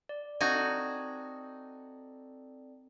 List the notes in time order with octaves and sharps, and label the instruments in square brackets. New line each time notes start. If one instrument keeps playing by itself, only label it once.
[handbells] D5
[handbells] C4 A4 D5 [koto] D#4 F#4 G#5